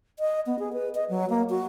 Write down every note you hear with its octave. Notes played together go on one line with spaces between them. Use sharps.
D#5
B3
G#4
B4
D#5
F#3
A#3
F#4